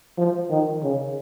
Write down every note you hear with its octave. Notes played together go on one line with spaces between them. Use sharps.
F3
D#3
C#3